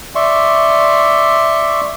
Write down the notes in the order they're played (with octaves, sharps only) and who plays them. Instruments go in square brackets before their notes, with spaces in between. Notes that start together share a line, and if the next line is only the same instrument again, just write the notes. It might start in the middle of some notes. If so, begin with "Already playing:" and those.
[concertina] D5 E5 C6 C#6